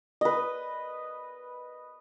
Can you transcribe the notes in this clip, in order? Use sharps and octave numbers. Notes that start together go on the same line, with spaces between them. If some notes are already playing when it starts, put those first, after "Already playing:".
B4 D#5